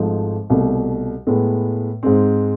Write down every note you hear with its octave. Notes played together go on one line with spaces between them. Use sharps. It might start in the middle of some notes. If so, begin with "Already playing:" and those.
Already playing: G#1 G#2 F3 A3
C2 B2 A3
A2 G#3 B3
G#2 G#3 C4